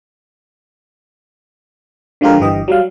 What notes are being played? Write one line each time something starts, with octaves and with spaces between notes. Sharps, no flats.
D3 F3 G#3 F4 G4 A#4
G1 G2 E3 G4 D#5
F#3 G3 F5